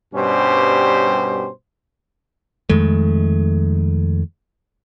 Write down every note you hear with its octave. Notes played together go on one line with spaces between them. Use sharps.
G2 B2 G3 C#4 G4 C5
F2 D#3 G#3 A3